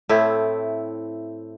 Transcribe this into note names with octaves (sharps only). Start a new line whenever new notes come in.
A2 A3 C4 E4